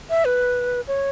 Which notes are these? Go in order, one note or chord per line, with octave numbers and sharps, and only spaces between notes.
E5
B4
C#5